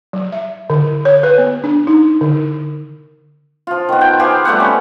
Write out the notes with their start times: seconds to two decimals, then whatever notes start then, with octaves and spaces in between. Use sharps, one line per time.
0.13 F#3
0.32 E5
0.70 D3
1.05 C#5
1.23 B4
1.38 B3
1.64 D4
1.87 D#4
2.21 D3
3.67 F3 F4
3.89 D#3 B3
4.01 G5
4.19 F4 G4 G#4 C5
4.45 G3 A3 B3 F#5
4.60 C#4